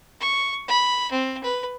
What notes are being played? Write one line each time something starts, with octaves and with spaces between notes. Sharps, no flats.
C#6
B5
C4
B4